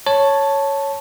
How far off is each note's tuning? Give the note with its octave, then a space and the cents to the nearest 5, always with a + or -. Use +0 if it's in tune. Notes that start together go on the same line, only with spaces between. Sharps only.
C#5 +0 A5 +0